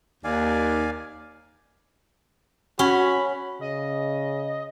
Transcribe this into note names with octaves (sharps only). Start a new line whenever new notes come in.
D#2 D5 F5 G#5
C#4 F#4 B5
C#3 D#5